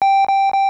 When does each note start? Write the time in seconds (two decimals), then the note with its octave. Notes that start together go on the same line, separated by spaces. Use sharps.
0.02 G5
0.29 G5
0.54 G5